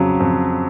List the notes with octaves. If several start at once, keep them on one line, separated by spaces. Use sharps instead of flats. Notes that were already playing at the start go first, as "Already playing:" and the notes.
Already playing: F2 C#3 F#3
F2